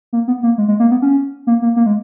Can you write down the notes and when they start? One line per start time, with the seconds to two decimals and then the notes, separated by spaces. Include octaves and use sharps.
0.13 A#3
0.28 B3
0.43 A#3
0.58 G#3
0.68 G#3
0.80 A#3
0.91 B3
1.02 C#4
1.47 A#3
1.62 A#3
1.76 A#3
1.86 G#3